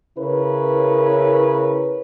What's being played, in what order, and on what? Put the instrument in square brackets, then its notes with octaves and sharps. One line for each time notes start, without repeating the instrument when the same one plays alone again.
[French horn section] C#3 E4 A#4 B4 C#5